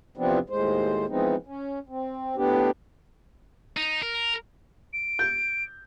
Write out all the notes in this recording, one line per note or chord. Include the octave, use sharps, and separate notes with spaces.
E2 C3 F3 B3 C4 D4
D#2 A2 G#3 C5
E3 F3 G#3 B3 C4 D#4
C#4
C4
A2 B3 D4 G4
D#4
A#4
D7
G6